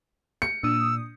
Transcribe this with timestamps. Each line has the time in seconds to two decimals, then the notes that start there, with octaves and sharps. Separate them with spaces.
0.42 C#7
0.63 A#2 D4 D#6 E6